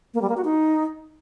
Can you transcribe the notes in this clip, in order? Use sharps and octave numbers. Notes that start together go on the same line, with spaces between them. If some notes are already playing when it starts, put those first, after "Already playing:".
A#3
G3
A#3
F#4
D#4